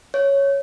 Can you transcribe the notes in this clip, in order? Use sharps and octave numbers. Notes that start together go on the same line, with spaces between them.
C#5